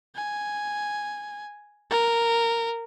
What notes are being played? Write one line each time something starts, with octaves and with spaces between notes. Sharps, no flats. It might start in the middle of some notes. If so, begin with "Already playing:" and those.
G#5
A#4